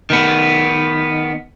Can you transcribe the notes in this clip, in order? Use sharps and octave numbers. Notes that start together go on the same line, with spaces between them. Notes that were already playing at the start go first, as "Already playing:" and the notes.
D#3 B3